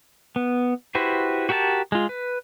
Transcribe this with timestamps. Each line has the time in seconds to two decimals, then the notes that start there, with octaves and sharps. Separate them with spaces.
0.36 B3
0.95 E4 F#4 G4 B4 C5
1.49 F#4 G4 A#4 E5 A5
1.92 G#3 F4
2.09 B4